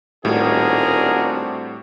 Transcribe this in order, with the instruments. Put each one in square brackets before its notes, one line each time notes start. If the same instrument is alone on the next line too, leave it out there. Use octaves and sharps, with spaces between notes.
[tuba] D#1 [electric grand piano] A2 G3 [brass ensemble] C4 D4 F#4 [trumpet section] G#4 A#4